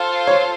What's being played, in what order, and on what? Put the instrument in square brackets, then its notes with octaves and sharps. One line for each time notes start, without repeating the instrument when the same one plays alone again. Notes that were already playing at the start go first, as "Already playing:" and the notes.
Already playing: [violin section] F4 A4 C5 F5
[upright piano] C#5